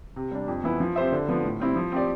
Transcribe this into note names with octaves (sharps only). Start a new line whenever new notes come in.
C3
G3 D4
F2
E3 B3 E4
F3
C4 G4 C5 E5
D3
F3 B3
A2
G3 C4 E4
F3
C4 G4 D5